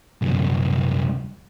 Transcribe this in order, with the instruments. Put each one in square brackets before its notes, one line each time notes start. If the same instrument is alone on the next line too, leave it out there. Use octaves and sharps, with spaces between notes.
[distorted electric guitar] C2 F#2